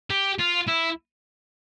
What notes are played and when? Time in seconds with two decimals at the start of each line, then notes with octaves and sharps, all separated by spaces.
0.10 G4
0.39 F4
0.68 E4